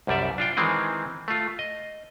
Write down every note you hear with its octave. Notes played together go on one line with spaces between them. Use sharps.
C2 F#2 G3 D5 E5
D4 F4 G5
D#3 E3 G#3 C4 G#4
A3 F4
D#5